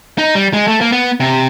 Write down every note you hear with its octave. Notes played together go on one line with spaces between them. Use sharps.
D#4
G3
G#3
A3
A#3
B3
C3